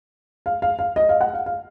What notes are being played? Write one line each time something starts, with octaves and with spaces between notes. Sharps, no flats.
F5
F5
F5
D#5
F5
F#5
F5
F5